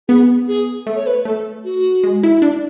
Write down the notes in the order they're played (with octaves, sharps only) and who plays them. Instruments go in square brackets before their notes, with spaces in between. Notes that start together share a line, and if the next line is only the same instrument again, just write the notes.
[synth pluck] B3 [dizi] G#4
[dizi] G#4
[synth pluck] A3
[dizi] C#5
B4
[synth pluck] A3 [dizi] A4
[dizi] F#4
[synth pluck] G#3
E4
D4